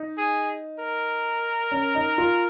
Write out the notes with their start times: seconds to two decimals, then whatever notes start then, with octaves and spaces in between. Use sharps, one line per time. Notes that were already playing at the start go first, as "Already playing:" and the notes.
Already playing: D#4
0.18 G#4
0.80 A#4
1.71 C#4
1.95 D#4
2.18 F4